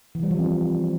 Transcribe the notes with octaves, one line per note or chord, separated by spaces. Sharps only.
E3
G3
F3
C4